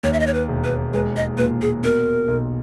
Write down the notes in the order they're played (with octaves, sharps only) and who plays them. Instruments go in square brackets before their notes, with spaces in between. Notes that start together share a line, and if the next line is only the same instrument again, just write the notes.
[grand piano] D#2 [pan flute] C#5
[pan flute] E5
D#5
C#5
B4
[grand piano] E1
[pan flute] B4
[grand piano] G#3 [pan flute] B4
[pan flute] D#5
[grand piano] A#2 [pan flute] B4
[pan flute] G#4
[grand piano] B2 [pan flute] A#4
[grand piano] B1